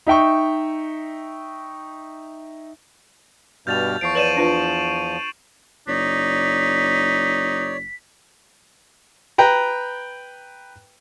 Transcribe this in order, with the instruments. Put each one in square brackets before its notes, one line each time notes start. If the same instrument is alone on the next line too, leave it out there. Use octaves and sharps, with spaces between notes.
[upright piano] D#4 E5 G5 C#6
[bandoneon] G2 B2 F6 [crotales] G6 A6 F7
[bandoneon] E2 F3 [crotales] C#6 C7 D7
[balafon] B4 C#5 D5 [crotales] D#7 E7 F#7
[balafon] D4 F4 B4
[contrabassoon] F#1 [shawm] D#4 [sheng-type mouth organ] C#5 D5 [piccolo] B6
[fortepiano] B4 G5 A#5